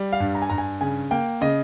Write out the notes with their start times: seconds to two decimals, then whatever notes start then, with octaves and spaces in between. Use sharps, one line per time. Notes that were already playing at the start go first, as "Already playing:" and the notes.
Already playing: G3
0.13 F5
0.20 G2
0.35 A#5
0.42 G#5
0.50 G2 A#5
0.58 G#5
0.81 C#3 G#5
1.11 A#3 G5
1.41 C#3 D#5